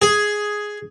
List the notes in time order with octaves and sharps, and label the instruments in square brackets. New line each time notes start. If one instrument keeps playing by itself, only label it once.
[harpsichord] G#4